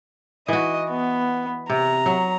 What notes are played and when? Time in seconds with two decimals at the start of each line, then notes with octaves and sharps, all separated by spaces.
0.48 E3 F#4 D#5
0.90 B3
1.70 C3 A#5
2.06 F#3